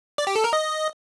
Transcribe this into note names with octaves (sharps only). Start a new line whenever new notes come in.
D5
G4
A4
A#4
D#5